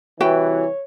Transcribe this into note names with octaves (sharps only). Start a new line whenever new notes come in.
C2 E3 F#4 B4 C#5 G5